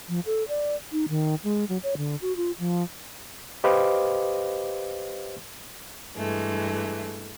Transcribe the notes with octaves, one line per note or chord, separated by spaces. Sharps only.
F3
A4
D5
D#4
D#3
G#3
F#3
C#5
D3
F#4
F4
F3
G4 B4 C5 D#5 F5 D6
G2 E3 G#3 A3